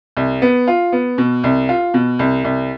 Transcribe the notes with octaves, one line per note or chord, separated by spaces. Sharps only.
C2
B3
F4
B3
B2
C2
F4
B2
C2
C2